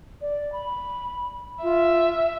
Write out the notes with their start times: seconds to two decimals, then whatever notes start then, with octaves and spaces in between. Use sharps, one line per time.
0.21 D5
0.52 B5
1.63 F4 E5